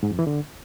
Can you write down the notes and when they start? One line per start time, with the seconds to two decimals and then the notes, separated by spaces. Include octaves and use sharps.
0.03 G#2
0.11 F2
0.19 E3
0.27 D3